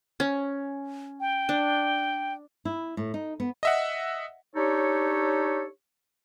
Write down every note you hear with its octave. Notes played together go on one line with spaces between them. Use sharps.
C#4
G5
D4
E4
A2
D#4
B3
D#5 E5 F#5
D4 D#4 G4 A4 C#5